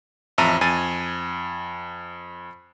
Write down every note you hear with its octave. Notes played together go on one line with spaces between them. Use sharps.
A1 F2 E5 A5 A#5 D#7
F2 G#5 G#6 A6 D#7